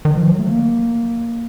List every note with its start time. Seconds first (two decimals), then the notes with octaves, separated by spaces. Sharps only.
0.05 D#3
0.17 F3
0.28 F#3
0.39 A3
0.49 A#3